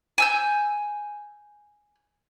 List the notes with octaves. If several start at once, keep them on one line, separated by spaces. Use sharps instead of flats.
G#5 E6 G6